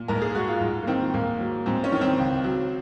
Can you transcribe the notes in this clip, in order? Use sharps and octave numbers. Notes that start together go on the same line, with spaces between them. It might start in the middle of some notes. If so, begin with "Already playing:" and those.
Already playing: A#2
G#2 A#4
G#4
G#3 F#4
F4
G#2
A#3
D#3 C4
G#2 A#3
F#3
G#2 C4
C#4
D#3
C4
C#2
F#3